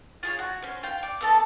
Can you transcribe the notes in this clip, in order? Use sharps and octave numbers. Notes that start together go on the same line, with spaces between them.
F4 G#4 C#5
F#4
C#4 C5
F4 F5 G5
D5
B3 A4 A5